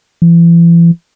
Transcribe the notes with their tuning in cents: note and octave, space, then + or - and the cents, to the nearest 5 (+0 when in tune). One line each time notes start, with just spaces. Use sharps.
E3 +40